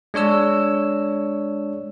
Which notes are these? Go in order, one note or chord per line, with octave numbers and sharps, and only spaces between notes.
G#3 D4 C#5 E6